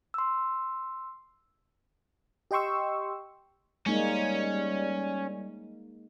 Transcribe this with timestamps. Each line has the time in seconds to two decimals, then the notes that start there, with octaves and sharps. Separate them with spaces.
0.14 C6 E6
2.51 G4 D#5 G5 C6 C#6 E6
3.86 G3 G#3 A#3 C#4 D#4